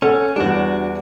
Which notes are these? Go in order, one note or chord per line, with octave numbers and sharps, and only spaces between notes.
C#4 A4 F#5
E2 G3 D4 F#4